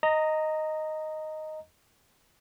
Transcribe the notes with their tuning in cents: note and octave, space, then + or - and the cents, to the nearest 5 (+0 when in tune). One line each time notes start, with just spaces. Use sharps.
D#5 +0 A#5 -15